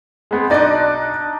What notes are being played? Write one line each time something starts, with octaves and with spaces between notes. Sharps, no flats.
G#3 B3 C4
B1 D4 D#4 D5 D#5